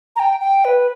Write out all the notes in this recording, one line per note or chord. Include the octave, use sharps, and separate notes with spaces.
A#5
G5
G5
B4